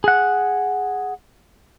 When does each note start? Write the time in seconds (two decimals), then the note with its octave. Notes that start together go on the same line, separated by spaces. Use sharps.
0.04 G#4 F#5